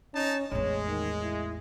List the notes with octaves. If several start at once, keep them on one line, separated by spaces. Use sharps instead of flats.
C#4 D#4 A5
A1 E2 G#3 C#5
D#3
E4